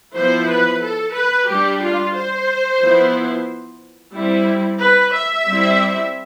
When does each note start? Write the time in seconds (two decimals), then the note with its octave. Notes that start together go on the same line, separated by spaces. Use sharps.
0.15 F3 B3 E4 C5
0.49 B4
0.82 A4
1.14 B4
1.48 G3 D4 G4
1.81 F4
2.15 C5
2.80 F3 B3 E4
4.14 G3 C4 E4
4.80 B4
5.14 E5
5.46 G3 C4 E4